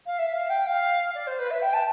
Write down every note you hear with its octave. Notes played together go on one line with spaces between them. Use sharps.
F5
E5
F5
G5
F5
D5
C5
B4
E5
G5
A5